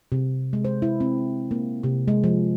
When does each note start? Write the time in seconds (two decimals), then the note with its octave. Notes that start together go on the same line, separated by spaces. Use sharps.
0.12 C3
0.53 G#3
0.65 C5
0.82 E4
1.00 C4
1.51 A#3
1.83 C3
2.08 G#3
2.24 F3